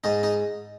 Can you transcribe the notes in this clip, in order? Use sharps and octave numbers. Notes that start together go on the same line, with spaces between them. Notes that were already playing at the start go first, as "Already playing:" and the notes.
G#2 D#4
D#4